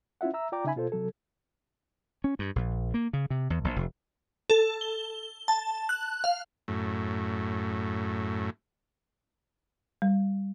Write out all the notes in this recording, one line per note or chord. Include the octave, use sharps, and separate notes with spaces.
C#4 E4 F4 E5 F#5
E5 A#5 E6
F4 D5 G5 A#5 D6
C#3 D#4 E5 G#5 B5
B2 F4 A4 C5
C3 F#3 A4
C#4
G2
A#1
A#3
C#3
C3
E2
A#1
F1
A4
G7
A5
F#6
F5
F#2 A2
G3